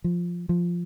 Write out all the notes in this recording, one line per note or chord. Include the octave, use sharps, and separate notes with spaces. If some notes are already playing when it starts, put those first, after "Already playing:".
F3
F3